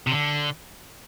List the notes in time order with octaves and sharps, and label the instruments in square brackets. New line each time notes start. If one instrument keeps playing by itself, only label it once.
[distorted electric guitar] C3
D3